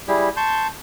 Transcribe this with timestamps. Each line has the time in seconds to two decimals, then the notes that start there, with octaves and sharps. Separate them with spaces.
0.08 G3 E4 G4 G#4
0.37 A5 C6 C#6 G6